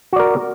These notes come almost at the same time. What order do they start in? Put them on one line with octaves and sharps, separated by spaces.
F#4 D5 A#4